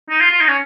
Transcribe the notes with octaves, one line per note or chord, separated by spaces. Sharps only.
D#4
F4
F4
D#4
C#4